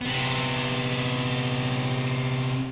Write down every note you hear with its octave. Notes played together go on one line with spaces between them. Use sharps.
C3 B3